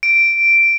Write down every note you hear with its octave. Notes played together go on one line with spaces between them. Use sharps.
D7